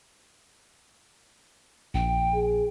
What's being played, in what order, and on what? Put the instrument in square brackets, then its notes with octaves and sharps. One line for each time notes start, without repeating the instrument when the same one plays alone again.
[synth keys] A#1 [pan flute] G5
[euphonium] G#4